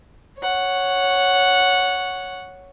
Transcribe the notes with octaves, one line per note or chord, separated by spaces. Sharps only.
C#5 F#5